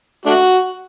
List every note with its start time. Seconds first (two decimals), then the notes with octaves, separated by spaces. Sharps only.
0.26 A3 D4 F#4